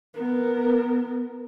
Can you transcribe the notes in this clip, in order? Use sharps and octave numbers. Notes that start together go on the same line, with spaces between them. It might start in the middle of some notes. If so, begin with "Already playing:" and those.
B3 A#4